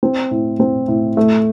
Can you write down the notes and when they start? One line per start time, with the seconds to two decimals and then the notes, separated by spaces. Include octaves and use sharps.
0.03 C4
0.31 A2
0.60 C4
0.88 A2
1.17 A3